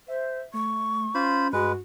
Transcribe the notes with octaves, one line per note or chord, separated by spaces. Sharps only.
C5 E5
A3 C#6
C#4 F4 C5 B5
G2 G#3 F#4 B4